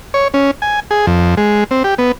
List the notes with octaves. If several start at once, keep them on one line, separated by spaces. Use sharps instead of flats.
C#5
C#4
G#5
G#4
F2
G#3
C4
G4
B3